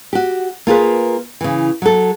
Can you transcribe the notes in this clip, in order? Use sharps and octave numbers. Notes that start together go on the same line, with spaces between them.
F#4 G4
A#3 F4 G#4 B4
C#3 E3
F#3 A4